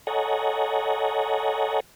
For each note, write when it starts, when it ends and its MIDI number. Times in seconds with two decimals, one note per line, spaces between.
0.07 1.80 69
0.07 1.80 73
0.07 1.80 75
0.07 1.80 78
0.07 1.80 80
0.07 1.80 82